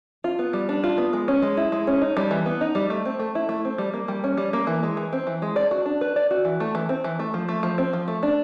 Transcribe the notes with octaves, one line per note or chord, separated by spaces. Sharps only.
F4
B3
G3
D4
F4
B3
G#3
C#4
G#3
E4
G#3
C#4
D#4
G3
E3
B3
D#4
G3
A3
C4
A3
E4
A3
C4
G3
A#3
G3
C#4
G3
A#3
E3
G#3
E3
C4
E3
G#3
D5
F#4
D4
B4
D5
F#4
E3
A3
E3
C4
E3
A3
F3
A3
F3
C4
F3
A3
D4